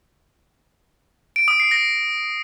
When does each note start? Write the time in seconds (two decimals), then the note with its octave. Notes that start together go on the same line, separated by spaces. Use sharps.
1.36 D7
1.48 D#6
1.60 C7
1.71 A#6